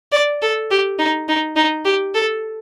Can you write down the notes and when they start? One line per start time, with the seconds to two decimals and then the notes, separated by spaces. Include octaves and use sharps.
0.12 D5
0.42 A4
0.71 G4
0.99 D#4
1.29 D#4
1.56 D#4
1.85 G4
2.15 A4